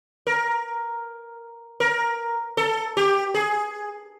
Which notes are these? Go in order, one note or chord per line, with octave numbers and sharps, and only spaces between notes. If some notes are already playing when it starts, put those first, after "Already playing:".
A#4
A#4
A4
G4
G#4